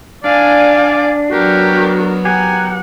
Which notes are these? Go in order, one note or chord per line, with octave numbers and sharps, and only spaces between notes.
D4 D5 F5 G#5
F#3 B3 F#4 G4 A#4
G4 A#4 F#5 G#5